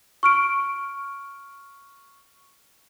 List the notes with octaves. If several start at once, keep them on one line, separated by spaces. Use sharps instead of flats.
C#6 F6 D7